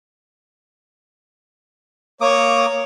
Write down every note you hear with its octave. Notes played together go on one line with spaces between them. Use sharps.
A#3 C#5 D6 D#6